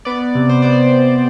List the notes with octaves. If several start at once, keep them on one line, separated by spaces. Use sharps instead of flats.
B3 D5
C3
C5
B3 D5